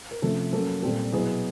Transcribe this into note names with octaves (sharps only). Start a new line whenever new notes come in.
A#4
C3 F3 A3 C#4 A4
F#3 A#3 C#4 A4
A#2 G3 C4 F4 A4
B2 F#3 B3 E4 G#4